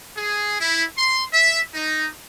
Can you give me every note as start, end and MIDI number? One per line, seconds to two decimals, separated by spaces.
0.16 0.59 68
0.60 0.84 64
0.98 1.24 84
1.33 1.59 76
1.74 2.07 63